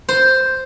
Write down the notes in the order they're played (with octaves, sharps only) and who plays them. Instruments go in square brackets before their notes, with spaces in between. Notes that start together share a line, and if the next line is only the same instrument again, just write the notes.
[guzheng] C5